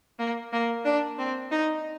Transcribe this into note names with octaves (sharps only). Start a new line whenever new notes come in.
A#3
A#3
D4
C4
D#4